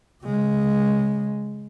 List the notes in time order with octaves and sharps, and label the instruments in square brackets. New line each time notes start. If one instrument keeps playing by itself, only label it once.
[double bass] C#3 G#3